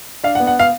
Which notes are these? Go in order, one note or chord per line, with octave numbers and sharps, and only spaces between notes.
D4 F5
F#5
B3
F#5
F5